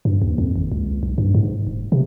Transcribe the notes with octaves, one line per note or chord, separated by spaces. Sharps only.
G2
D#2
F2
G#1
C#2
B1
G2
G#2
E1
C3